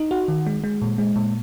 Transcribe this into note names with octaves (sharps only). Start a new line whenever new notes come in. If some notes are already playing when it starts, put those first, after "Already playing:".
Already playing: D#4
F#4
D#3
G#3
G#3
A#2
G#3
A#2